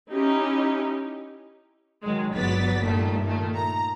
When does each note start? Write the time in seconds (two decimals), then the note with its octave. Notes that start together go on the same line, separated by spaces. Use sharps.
0.10 C#4 D#4 E4 G4
2.03 D#3 F#3 G#3
2.35 G1 F#3 B3 D5 A6 B6
2.83 G2 A#2 D#3 G3 A3
3.23 A#2 D#3 A3
3.56 A#5